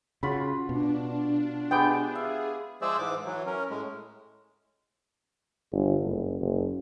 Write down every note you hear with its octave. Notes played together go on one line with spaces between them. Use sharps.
C#3 F4 F#4 B5
B2 D4
G#3 B3 G4 G5
G#4 E5 F5
F3 G#3 G#4 C5 D5 E5
G#2 E3 D6
E3 F#3
C#4 A#4
A2 G#3
G1
F#1
F#1